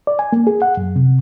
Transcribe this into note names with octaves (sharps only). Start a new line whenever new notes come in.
D5
G#5
A#3
G#4
F#5
F#2
C3